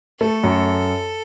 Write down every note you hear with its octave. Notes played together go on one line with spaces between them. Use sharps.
A3 A4
F#2